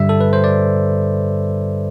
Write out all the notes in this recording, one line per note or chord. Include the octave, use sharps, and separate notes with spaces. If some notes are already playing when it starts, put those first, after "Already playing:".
Already playing: G2 D3 G3 E5
A4
B4
C5
D5